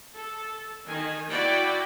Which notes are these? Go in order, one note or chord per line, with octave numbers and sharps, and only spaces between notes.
A4
D#3 G#5
E4 F#4 D5 G5